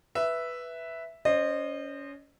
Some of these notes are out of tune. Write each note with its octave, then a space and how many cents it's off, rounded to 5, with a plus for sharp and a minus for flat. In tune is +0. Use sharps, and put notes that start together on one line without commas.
B4 +0 E5 +0
C#4 +25 C5 +5 D#5 -25